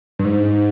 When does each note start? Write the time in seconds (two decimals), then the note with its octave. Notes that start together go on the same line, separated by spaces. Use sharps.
0.19 G2
0.25 G#2